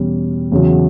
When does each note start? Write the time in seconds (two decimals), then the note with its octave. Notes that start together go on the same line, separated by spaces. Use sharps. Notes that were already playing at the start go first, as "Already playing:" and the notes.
Already playing: E2 B2 G3 C#4
0.52 E2 C#3 F#3